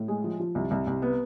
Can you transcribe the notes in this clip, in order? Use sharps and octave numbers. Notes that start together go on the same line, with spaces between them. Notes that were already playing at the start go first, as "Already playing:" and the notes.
Already playing: A2
G#3
F3
F3
C2
C2
C2
B3